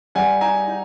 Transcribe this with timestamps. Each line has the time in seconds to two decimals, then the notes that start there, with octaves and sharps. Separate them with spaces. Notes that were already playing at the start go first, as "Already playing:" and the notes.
0.15 G3 F#5 G#5
0.41 D#4 G#5 A#5
0.68 D#4